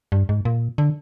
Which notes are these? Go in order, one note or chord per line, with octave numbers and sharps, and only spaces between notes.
G2
G#2
A#2
D3